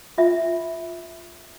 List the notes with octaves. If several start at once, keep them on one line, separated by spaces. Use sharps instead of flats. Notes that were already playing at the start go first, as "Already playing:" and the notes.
F4 E5